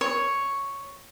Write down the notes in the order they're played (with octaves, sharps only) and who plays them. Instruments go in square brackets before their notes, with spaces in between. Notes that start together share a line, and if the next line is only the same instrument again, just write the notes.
[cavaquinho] C#5